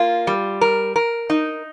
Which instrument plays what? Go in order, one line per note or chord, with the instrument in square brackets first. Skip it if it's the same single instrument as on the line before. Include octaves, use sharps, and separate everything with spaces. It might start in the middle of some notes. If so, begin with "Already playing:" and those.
Already playing: [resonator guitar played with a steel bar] A#3 F4
G3
A#4
A#4
D#4